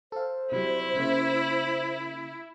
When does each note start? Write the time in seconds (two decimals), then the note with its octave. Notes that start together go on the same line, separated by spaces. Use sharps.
0.12 A4 C5 F5
0.52 C3 F#3 G3 E4
0.96 C#3 A#3 E5